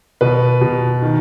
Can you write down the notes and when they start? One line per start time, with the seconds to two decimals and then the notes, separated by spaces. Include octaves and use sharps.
0.21 B2 B4
0.61 B2
1.02 D#3